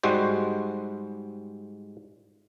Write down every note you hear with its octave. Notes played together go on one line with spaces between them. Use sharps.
G#2 G3 G#3 F#4 C5